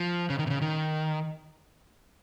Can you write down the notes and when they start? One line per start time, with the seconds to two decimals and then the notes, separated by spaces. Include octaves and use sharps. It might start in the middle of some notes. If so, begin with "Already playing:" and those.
Already playing: F3
0.30 C#3
0.39 D#3
0.47 C3
0.50 C#3
0.62 D#3